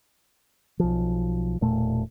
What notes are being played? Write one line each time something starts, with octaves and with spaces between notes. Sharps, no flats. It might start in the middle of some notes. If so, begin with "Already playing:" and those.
B1 F3
E1 A#2 A3